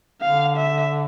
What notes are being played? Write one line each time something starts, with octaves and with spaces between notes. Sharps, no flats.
D3 F5
E5